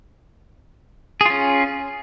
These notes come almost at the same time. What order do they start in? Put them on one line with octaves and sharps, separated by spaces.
G#4 F4 C#4